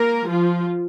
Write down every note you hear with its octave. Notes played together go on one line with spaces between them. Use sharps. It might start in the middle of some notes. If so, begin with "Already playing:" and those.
Already playing: A#3 A#4
F3 F4